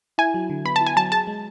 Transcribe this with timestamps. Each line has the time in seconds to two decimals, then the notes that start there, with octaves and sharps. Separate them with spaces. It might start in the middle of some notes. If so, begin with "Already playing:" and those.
0.18 E4 G#5
0.34 F#3
0.50 D3
0.65 B3 B5
0.76 A5
0.81 E4
0.87 G#5
0.96 F#3 A5
1.12 G#4 A5
1.27 G#3